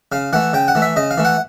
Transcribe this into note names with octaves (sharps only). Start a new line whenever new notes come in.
C#3 F5
E3 A3 F#5
C#3 G5
F#5
E3 A3
E5
C#3 D#5
F5
E3 A3
F#5